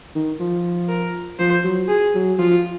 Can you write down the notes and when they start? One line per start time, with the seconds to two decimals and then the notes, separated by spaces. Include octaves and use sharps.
0.15 D#3
0.40 F3
0.89 A#4
1.39 F3 C5
1.64 F#3
1.88 G#4
2.15 F#3
2.38 F3 F4